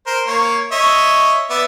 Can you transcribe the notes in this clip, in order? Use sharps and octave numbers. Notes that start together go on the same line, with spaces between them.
A#4 C5
A#3 C#5
C#5 D#5 E5
B3 D5 E5